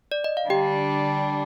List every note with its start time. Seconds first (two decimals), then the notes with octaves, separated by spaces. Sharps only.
0.12 D5
0.24 D#5
0.37 F5
0.50 D3 G3 D4 G4 G5